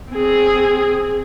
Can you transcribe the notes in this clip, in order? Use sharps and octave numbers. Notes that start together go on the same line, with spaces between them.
C4 G#4